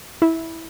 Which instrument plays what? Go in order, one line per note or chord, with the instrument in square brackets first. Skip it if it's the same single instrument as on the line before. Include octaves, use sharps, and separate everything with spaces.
[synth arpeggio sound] E4